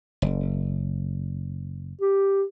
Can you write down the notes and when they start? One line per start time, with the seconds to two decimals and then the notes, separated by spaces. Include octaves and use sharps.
0.22 F#1
2.01 G4